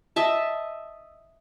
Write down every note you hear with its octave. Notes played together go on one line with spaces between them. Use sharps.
D#5 E5 A5